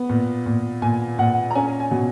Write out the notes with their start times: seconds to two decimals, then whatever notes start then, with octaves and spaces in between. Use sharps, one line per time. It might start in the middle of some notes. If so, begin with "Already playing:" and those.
Already playing: B3
0.09 A#2
0.46 A#2
0.82 A#2 G#5
1.19 A#2 F#5
1.51 A#5
1.55 C#4 G#5
1.80 G#5
1.91 B2